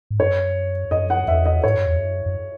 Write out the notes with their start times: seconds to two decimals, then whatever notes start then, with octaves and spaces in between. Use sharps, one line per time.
0.11 G#2
0.20 F#2 C#5
0.91 F#2 D#5
1.10 F#5
1.27 E2 E5
1.46 D#5
1.64 G#2 C#5
1.75 F#2
1.86 E2
1.97 F#2
2.26 F#2